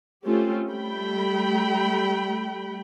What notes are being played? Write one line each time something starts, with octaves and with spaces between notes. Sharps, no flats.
A3 C4 C#4 F4 G4
G3 A3 G5 B5